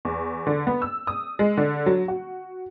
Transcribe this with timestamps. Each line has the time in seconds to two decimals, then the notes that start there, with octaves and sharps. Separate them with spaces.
0.05 E2
0.47 D3
0.67 B3
0.82 E6
1.07 D#6
1.39 G#3
1.57 D3
1.86 F#3
2.08 F#4